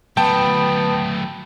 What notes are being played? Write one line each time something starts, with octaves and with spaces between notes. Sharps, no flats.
F#3 A3 B3 G5 A5